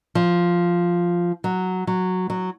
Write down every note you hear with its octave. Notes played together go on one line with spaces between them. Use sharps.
F3
F#3
F#3
F#3